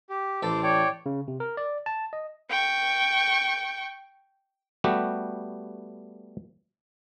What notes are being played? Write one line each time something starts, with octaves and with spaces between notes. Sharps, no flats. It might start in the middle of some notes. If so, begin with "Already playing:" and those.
G4
A1 A4 C5 D6
C#5 D5 G5
C#3
C3
A#4
D5
A5
D#5
G5 C#6
G3 A3 B3 F#4 G4